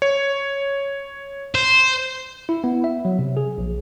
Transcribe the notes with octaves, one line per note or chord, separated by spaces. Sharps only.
C#5
C5
E4
B3
E5
F#3
C3
G#4
A#1